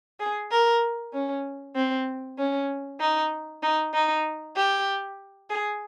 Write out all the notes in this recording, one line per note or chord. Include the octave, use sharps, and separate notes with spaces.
G#4
A#4
C#4
C4
C#4
D#4
D#4
D#4
G4
G#4